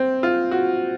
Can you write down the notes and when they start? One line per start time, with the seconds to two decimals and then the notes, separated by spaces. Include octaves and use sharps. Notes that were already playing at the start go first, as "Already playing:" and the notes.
Already playing: C4
0.23 F4
0.51 F#4